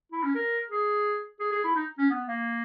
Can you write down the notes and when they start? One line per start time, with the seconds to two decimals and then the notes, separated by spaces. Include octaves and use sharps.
0.12 E4
0.23 C#4
0.35 A#4
0.70 G#4
1.40 G#4
1.52 G#4
1.64 E4
1.76 D#4
1.98 C#4
2.10 B3
2.27 A#3